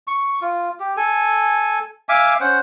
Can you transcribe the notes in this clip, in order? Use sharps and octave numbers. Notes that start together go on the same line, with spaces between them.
C#6
F4
G4
A4 G#5
E5 F5 G#5 D6
C#4 C5 F#5